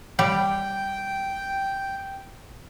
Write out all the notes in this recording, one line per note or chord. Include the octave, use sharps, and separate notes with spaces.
G3 G4 G5